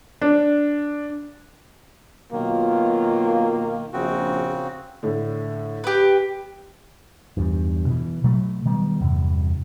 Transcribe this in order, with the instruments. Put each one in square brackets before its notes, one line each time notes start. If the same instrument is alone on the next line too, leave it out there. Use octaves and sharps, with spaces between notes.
[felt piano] D4
[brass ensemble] B2 F#3 F4 [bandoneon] D#3 [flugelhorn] A#3
[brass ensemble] A#1 [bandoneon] C#3 C4 F#4
[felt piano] A2 D3
[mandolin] G4 B4
[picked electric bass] E2 G2
B2 E3
B2 F#3 A3
D#3 G3 B3
E2 G2 C3